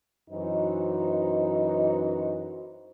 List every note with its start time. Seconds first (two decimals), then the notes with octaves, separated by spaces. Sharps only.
0.30 F#2 E3 D#4 F#4 C5 D#5